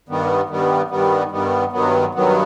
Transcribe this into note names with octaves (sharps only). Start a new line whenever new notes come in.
G2 D#3 G3 B3
G2 D#3 G3 B3
G2 D#3 G3 B3
G2 D#3 G3 B3
G2 D#3 F#3 B3
G2 D#3 F#3 B3